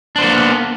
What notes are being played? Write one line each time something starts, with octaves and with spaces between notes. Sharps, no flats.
A#3 B3 D4 C5